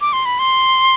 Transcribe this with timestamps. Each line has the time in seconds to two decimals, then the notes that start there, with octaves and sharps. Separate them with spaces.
0.01 D6
0.13 C6
0.25 B5
0.39 C6